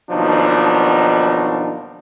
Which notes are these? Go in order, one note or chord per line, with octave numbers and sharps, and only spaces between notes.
D#2 B2 F3 F#3 D4 D#4